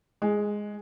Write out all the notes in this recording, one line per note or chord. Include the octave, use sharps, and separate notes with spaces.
G#3